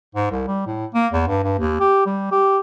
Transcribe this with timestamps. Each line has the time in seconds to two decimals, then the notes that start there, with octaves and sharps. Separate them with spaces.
0.15 G#2
0.31 C2
0.47 G3
0.66 A2
0.94 A#3
1.12 E2
1.27 G2
1.43 G2
1.58 D#2
1.80 G4
2.06 G3
2.32 G4